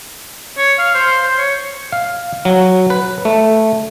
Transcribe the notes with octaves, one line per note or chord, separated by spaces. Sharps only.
C#5
F5
C5
C5
C#5
F5
F#3
B4
A3